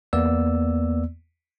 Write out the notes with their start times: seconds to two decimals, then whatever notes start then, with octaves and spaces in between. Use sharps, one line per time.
0.13 E2 A#3 B3 D5 E6